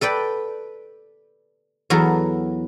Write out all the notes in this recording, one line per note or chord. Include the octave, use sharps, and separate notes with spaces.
A4 B4 D5 G5
E2 F#3 B3 A4 A#4